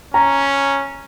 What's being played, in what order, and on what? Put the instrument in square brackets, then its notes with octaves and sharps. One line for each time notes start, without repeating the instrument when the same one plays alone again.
[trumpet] C#4 [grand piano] A#5